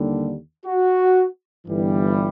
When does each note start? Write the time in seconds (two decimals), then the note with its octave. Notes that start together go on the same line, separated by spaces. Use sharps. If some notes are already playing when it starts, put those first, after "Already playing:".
Already playing: D#2 D3 G3
0.66 F#4
1.66 G1 G2 E3 G3